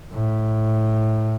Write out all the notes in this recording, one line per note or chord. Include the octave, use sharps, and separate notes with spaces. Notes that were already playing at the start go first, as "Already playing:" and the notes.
A2